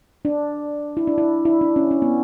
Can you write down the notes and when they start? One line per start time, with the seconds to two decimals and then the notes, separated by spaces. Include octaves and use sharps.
0.25 D4
0.97 E4
1.07 D4
1.18 E4
1.45 E4
1.61 D4
1.76 C#4
1.91 C#4
2.02 B3